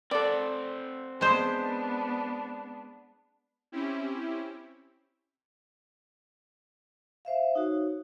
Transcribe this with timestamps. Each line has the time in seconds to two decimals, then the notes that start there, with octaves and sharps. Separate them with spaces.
0.11 C4 A4 D5 F#5
1.21 G#3 B3 D4 C5
3.72 C4 C#4 E4 G4
7.25 C5 E5 F5
7.55 D#4 F#4 C#5